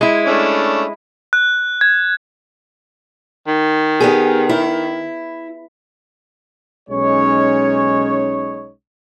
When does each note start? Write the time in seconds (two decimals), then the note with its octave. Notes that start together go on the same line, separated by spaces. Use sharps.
0.01 G#3 E4
0.26 A3 C#4 D4
1.33 F#6
1.81 G#6
3.47 D#3
4.00 B3 G4 G#4
4.49 E4
6.90 B1 G#3 C#4 D#4 C#5